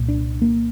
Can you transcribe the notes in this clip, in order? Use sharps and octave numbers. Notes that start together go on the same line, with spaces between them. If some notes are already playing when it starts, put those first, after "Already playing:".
Already playing: C2 A#2
D4
A#3